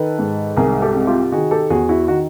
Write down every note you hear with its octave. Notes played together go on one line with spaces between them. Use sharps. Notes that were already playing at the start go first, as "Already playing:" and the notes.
Already playing: D#3 A4 B4
G#2
C2 G#4 A#4
G4 A4
C3
F4 G4
D#3 F#4 G#4
G4 A4
E2 F#4 G#4
E4 F#4
D#3 F#4